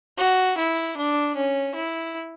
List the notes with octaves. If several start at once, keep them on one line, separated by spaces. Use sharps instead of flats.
F#4
E4
D4
C#4
E4